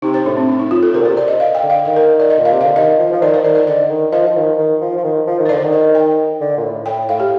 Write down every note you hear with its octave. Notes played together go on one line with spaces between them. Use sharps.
C3 D#4
C5
A2 D4
C4
D4
D#4
F4
A4
C3 A#4
A#2
C3 C5
D5
D#5
F5
G5
D3
F5
D#3 D#5
A#4
D5
D#5
A#2
F5
C3
D3 F5
D#3 D#5
F3
F3
D#3 D5
C5
D#3 D5
D5
D3 D#5
D#3
F3 D#5
F3
D#3
D#3
F3
F3
D#3
F3
D#3
C5
D3 D5
D#3
D#5
G5
D3
A#2
A2
A2 G5
A2 F5
G4